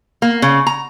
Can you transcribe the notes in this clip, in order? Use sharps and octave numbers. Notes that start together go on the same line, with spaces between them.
A#3
C#3
A#5